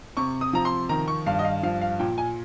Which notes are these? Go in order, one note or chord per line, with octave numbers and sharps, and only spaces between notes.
C3 C#6
D#6
F3 A#5
C6
D#3 A#5
C#6
G2 F5
D#5
F5
F3 F5
F5
A#2 G5
G#5